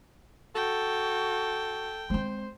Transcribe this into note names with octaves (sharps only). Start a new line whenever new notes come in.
F#4 A4 G5
G#3 C4 C5